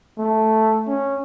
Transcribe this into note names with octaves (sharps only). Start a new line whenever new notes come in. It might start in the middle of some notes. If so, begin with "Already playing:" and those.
A3
C#4